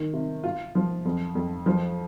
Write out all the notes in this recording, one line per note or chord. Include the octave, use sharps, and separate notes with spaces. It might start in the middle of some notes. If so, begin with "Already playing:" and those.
Already playing: D#3
C3
F4
F3
F2
F2
F3